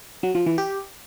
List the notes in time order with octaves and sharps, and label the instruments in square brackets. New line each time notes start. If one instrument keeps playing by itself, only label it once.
[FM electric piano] F#3
F3
E3
G4